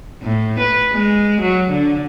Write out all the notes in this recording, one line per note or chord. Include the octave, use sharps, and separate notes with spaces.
A2
B4
G#3
F#3
D3